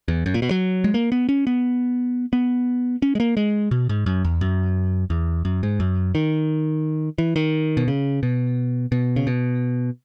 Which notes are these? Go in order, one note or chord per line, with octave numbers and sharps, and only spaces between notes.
E2
F#2
A#2
B2
F#3
G#3
A#3
B3
C#4
B3
B3
C#4
G#3
A#3
G#3
B2
G#2
F#2
E2
F#2
E2
F#2
G#2
F#2
D#3
E3
D#3
B2
C#3
B2
B2
C#3
B2